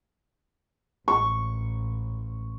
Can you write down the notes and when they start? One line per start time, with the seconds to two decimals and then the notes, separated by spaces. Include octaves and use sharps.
1.08 A1 C#6